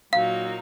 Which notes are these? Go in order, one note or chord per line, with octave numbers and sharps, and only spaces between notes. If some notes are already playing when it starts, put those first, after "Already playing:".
A#2 F#3 A#3 D#4 F5